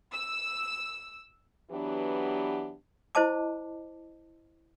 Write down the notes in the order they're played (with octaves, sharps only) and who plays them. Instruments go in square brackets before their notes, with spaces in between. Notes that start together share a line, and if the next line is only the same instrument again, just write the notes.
[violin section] E6
[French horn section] E3 F#3 B3 D4 G4
[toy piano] E4 C5 D#5 A5 D6